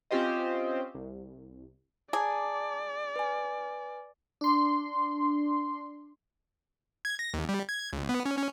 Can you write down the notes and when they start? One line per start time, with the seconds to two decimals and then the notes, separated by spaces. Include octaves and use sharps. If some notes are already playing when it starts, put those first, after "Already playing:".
0.11 C4 C#4 F4 G4 C5 D#5
0.95 C2
2.13 G#4 D5 A5 A#5 D6
3.16 B4 G#5
4.41 D4 C6
7.05 G#6
7.19 A#6
7.34 D#2
7.49 G3
7.69 G#6
7.93 C#2
8.09 B3
8.26 C#4
8.37 C#4